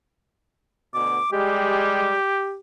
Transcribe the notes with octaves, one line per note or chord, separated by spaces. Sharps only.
D2 B2 D6
G3 G#3 G4